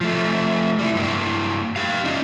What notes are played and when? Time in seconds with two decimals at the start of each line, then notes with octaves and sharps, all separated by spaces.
0.01 F3 A3
0.79 G3 E4
0.95 G2 A#3
1.76 G4 F5
2.05 C#4 D#4